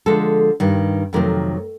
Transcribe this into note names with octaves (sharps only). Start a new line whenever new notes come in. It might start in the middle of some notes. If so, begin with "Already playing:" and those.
D3 F3 G#3 A4
G2 D#3 G3
F2 C3 D#3 F#3 A3 A#4